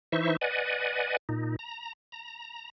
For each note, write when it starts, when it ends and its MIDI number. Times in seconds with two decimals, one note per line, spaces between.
0.12 0.36 52
0.12 0.36 63
0.12 0.36 64
0.12 0.36 72
0.12 0.36 76
0.12 0.36 85
0.41 1.17 71
0.41 1.17 74
0.41 1.17 75
0.41 1.17 78
0.41 1.17 80
1.29 1.56 46
1.29 1.56 63
1.59 1.93 82
2.12 2.70 82